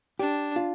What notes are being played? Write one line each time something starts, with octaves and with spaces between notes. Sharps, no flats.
D4 G4
F4